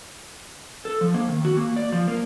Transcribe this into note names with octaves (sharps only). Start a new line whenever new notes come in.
A4
F3
A#3
D#3
F#4
A#3
D5
F3
A#3